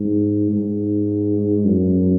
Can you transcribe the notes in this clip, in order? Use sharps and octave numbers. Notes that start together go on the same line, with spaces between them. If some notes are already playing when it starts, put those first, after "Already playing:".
Already playing: G#2
G#2
F#2